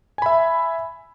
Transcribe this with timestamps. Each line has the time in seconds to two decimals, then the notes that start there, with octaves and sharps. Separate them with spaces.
0.18 G#5
0.22 B5
0.26 E5